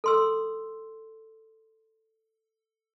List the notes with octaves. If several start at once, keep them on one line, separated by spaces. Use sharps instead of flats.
A4 C6 E6